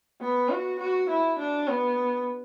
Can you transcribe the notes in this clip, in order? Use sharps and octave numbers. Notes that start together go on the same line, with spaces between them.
B3
F#4
F#4
E4
D4
B3